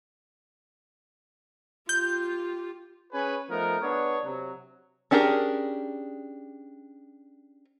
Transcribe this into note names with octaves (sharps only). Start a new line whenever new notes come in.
F4 G4 G6
C#4 G#4 B4 C#5 G#5
F3 A3 B3 D#4 A#4
B3 D4 G#4 B4 C#5
C3 F#3
C#4 D4 G4 G#4 A#4